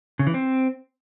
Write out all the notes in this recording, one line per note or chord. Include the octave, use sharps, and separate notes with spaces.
C#3
E3
C4